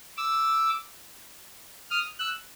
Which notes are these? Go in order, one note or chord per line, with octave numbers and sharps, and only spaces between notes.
D6 E6
D#6 F6
E6 F#6